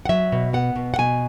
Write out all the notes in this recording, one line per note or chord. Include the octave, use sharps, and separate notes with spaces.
F#5
F#3 E5
B2
B3 F#5
B2
F#5
B2 G#5